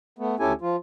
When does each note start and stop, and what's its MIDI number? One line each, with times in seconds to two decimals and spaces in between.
0.19 0.35 57
0.19 0.35 59
0.39 0.53 38
0.39 0.53 61
0.39 0.53 64
0.39 0.53 67
0.39 0.53 69
0.39 0.53 80
0.61 0.76 53
0.61 0.76 65